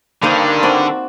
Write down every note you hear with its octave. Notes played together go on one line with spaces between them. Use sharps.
G2 D3 A#3 D#4 C5
C4 F#4 D5